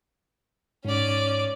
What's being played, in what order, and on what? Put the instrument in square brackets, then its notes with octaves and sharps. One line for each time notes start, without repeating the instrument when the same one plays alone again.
[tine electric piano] G#2 [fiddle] C#4 D5